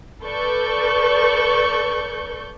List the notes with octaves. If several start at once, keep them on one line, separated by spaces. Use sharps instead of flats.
A4 B4 D5 C#6 G6